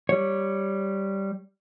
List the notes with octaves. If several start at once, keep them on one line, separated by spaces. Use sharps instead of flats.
G3 C#5